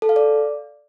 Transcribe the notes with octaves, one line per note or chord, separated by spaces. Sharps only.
A4
F5
D5